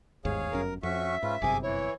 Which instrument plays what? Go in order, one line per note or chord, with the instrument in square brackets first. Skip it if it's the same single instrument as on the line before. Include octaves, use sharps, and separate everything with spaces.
[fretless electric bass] G1 D#2 G#2 [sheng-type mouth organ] G#4 C#5 F5
[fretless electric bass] G1 F#2 C#4 [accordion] A#4
[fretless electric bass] F2 [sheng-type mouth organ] C#4 F#4 C#6 [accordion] E5
[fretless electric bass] G#2 [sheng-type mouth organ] C#4 F4 B4
[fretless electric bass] G1 F#2 C3 [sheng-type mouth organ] G#4 D6 [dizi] G#5
[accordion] E3 [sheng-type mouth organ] E4 [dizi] C#5